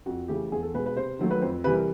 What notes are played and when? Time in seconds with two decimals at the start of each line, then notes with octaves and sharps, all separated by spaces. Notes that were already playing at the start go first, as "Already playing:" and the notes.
0.06 F2 F#4
0.28 C#3 E3 A3 G4
0.52 E2 G#4
0.63 A4
0.74 B2 G#3 B4
0.86 B4
0.96 C3 C5
1.19 D#3 F#3 A3
1.31 B4
1.41 F2 C5
1.64 C3 E3 G3 B4
1.75 A#4